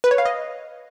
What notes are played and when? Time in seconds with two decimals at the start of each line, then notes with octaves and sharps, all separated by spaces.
0.04 B4
0.11 C#5
0.18 F5
0.25 D#5